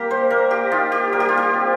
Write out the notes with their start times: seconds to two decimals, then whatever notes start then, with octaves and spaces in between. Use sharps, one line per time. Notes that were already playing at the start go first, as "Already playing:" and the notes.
Already playing: G3 A#3 G4 A#4
0.11 C5
0.30 A#3 A#4
0.51 G4
0.72 D#4 F4
0.92 G4
1.12 G3 A#4
1.20 G4
1.29 F4
1.37 G4
1.54 C4